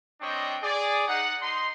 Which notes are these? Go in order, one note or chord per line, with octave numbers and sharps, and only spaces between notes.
G3 C4 D4 C#5 D#5 G5
G#4 D5
D#4 F#5
D#4 C6